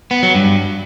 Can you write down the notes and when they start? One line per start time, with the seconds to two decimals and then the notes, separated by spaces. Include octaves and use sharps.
0.11 B3
0.23 F#3
0.35 G2